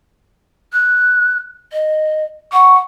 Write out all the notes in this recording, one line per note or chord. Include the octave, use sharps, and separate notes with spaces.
F#6
D#5
F#5 C#6